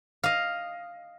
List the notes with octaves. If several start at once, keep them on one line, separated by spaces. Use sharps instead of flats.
D#5 F5